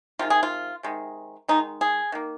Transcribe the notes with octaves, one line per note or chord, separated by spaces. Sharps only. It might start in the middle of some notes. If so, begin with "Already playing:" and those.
C3 D#3 G#3 F4
G#4
F4
C3 D#3 G#3
D#3 G#3 D#4
G#4
D#3 A#3